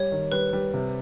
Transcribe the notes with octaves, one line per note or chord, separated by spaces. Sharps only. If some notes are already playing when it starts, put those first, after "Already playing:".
Already playing: G3 C#5
D#3
G3 B4
G3
C3